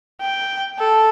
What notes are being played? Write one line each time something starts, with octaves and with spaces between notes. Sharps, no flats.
G5
A4